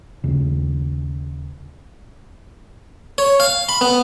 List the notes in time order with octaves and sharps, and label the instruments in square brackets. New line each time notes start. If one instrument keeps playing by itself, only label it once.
[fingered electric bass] D#2 C#3
[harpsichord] C#5
F5
B5
B3